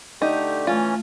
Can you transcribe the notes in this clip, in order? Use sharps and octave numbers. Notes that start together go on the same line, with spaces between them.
D3 A3 D#4 G4
E3 A3 C#4 F4